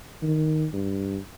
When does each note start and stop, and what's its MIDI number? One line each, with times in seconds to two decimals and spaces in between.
0.23 0.67 51
0.73 1.18 43